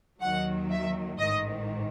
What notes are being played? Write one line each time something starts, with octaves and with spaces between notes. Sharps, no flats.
D#2 D#3 F#3 F#5
E5
A1 G#2 D#3 D#5